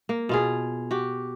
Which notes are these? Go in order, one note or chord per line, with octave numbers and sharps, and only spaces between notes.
A#3
B2 F4 G#4
F#4 G4